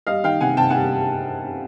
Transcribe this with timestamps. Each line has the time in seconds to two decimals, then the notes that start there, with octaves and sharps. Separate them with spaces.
0.07 G3 D#5 F5
0.24 D#3 F5 G5
0.40 C3 F#5 G#5
0.57 C3 G5 A5
0.70 F#5 G#5
0.74 G3